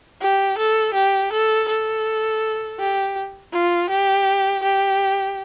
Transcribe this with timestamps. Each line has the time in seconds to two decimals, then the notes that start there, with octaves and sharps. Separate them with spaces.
0.21 G4
0.58 A4
0.94 G4
1.32 A4
1.68 A4
2.79 G4
3.53 F4
3.89 G4
4.63 G4